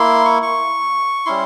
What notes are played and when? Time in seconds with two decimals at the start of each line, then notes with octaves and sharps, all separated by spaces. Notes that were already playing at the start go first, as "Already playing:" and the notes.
Already playing: A#3 E4 C6
0.25 C#6
0.42 C#6
1.26 G3 C#4 E4 C6